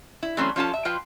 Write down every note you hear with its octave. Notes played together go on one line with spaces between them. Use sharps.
E4
E3 F#3 A3 C4 C#4
F3 C#4 F4 A4 A5
E5
F3 F4 B4 G5